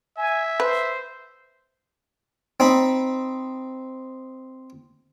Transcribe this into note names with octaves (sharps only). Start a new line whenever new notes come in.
E5 G#5
B4 C5
C4 D#4 B5